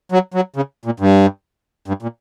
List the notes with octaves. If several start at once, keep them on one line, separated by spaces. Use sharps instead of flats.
F#3
F#3
C#3
A#2
G2
G2
A#2